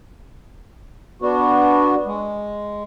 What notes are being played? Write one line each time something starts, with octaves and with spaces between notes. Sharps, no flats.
B3 D4 F#4
G#3